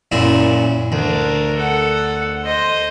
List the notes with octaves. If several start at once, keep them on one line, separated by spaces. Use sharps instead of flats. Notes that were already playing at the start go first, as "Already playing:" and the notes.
F#2 A#2 E4
D2 D4 A#4
A4 F#5
C5 D#5